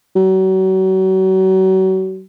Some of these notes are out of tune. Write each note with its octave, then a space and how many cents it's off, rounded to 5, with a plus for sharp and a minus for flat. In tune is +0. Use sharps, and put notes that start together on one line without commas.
F#3 +35